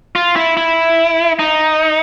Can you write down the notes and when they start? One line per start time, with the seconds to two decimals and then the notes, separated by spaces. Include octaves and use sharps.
0.16 F4
0.36 E4
0.57 E4
1.39 D#4